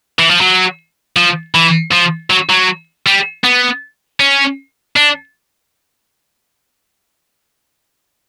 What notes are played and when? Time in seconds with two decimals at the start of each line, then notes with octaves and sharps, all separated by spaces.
0.19 E3
0.30 F3
0.41 F#3
1.16 F3
1.55 E3
1.92 F3
2.30 F#3
2.49 F#3
3.07 G3
3.44 B3
4.20 C#4
4.96 D4